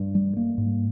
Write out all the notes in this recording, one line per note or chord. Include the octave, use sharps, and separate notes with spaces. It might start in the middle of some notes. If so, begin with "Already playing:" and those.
Already playing: G2
G3
A#3
G#2